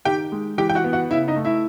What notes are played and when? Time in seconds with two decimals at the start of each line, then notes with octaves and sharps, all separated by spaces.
0.05 D#3 G4 G5
0.32 G#3
0.58 E3 G4 G5
0.69 G5
0.75 F#4 F#5
0.84 B3
0.93 F#4 F#5
1.10 C#3 E4 E5
1.28 D#4 D#5
1.36 A3
1.45 E4 E5